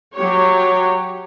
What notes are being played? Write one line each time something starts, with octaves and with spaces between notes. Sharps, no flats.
F#3 G4 C#5